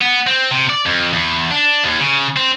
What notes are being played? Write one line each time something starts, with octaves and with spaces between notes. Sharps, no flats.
B3
C4
C3
D5
F2
E2
D4
D#2
C#3
C4